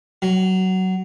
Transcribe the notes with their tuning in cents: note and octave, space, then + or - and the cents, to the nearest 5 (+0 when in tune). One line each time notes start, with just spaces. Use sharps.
F#3 +15